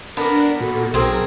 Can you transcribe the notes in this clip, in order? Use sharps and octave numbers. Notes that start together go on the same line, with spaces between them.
B3 D4 A#4
A#2 F#4 A4
B1 C4 G#4 A#4